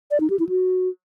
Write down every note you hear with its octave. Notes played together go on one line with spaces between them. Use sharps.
D5
D#4
G4
E4
F#4